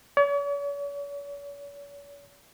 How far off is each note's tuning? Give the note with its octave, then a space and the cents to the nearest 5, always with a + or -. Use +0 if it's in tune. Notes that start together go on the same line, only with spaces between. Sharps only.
C#5 +45